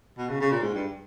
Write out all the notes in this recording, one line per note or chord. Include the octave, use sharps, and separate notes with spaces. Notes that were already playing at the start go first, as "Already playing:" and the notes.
B2
C#3
C#3
A#2
G#2
G2